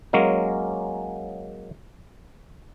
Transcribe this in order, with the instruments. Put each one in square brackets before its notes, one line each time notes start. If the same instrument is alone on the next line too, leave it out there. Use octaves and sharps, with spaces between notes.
[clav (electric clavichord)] F#3 G#3 A#3 C#4